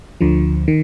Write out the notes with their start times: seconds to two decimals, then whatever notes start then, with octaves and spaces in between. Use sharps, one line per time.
0.21 D2 D3 F3
0.68 D#3